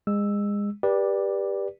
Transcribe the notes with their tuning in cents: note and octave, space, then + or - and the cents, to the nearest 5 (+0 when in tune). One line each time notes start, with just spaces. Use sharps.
G#3 -25 E6 +0
G4 +10 B4 -25 D5 +0